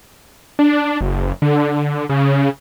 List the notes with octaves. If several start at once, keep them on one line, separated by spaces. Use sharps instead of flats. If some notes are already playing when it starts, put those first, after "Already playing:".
D4
F#1
D3
C#3